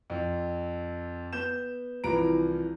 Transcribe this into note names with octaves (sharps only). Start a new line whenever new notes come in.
F2
B3 G6 E7
C2 E3 F3 B4 A#5 D7